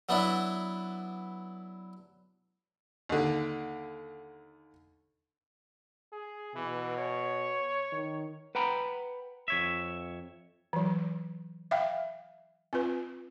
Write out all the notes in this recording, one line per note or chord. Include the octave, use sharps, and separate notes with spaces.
F#3 B3 D4 E4
D#2 D3
G#4
B2 E3
C#5
D#3
B4 F#5 G5 A#5 B5
F2 C#5 E5
E3 F#3
E5 F5 G5
C4 F4 B4